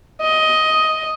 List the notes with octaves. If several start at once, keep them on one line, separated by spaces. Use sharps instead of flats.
D#5